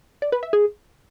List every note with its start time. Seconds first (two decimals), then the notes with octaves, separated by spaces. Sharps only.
0.22 D5
0.32 B4
0.43 E5
0.53 G#4